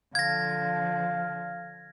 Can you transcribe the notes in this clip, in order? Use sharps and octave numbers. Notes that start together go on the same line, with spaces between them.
D3 F3 F5 G#6 A#6